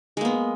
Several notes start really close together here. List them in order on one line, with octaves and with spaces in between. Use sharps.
G#3 A#3 B3